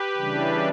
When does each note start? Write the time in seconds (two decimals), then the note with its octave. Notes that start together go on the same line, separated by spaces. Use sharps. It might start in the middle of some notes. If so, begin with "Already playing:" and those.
Already playing: G4 B4
0.17 C#3 E3 G3 D4